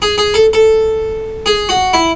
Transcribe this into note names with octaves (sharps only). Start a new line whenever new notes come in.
G#4
G#4
A4
A4
G#4
F#4
E4